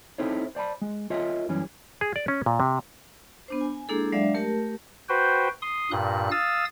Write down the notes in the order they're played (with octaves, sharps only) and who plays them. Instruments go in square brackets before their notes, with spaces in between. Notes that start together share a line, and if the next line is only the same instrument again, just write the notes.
[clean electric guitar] C4 D#4 E4 A4 C5 C#5
C5 D5 A5 B5
G#3
F4 A#4 C#5 D#5 E5
F#2 E3 G3 C#4
[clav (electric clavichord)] G#4
D5
C#4
A#2
C3
[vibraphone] B3 D4 C5
G#5
G#3 A#3 D4 E4 G#4 A4
F#3 G#3 D4 D5 E5 F5
A3 G4 A#4 A5
[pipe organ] F#4 B4 C5 G5
C6 D#6
G2 A#2 F#6
F5 D#6 E6 A6